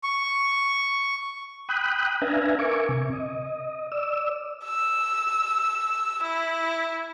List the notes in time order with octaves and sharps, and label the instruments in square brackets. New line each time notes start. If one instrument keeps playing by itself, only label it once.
[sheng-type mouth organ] C#6
[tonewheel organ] G5 B5 D#6 F#6
D4 B4 E5 F5 G#5 A#5
A#4 E5 G#5 C#6 D6
C3
D#5
D5 E6
[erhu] E6
E4